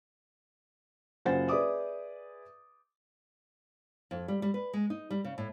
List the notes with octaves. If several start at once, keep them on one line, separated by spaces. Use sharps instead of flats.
F#1 F4 C5 F#5 G#5 A6
G#4 B4 D5 E5 D6 D#6
F2
G3
G3
B4
G#3
D#4
G3
C#3
A2